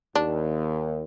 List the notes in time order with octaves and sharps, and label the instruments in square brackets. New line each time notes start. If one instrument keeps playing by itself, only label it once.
[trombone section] D#2 [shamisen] D4